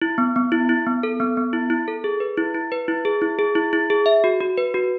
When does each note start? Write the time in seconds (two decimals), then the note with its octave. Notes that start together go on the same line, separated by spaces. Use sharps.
0.02 E4
0.18 B3
0.36 B3
0.52 E4
0.69 E4
0.87 B3
1.03 A4
1.20 B3
1.37 B3
1.53 E4
1.70 E4
1.88 A4
2.04 G#4
2.20 B4
2.37 E4
2.54 E4
2.72 B4
2.88 E4
3.05 G#4
3.22 E4
3.39 G#4
3.55 E4
3.73 E4
3.90 G#4
4.06 E5
4.24 F#4
4.41 F#4
4.58 B4
4.74 F#4